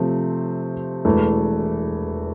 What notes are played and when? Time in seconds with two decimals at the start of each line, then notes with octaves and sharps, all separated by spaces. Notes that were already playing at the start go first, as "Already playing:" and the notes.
Already playing: C3 F3 A3 C4
1.05 E1 E2 E3 A3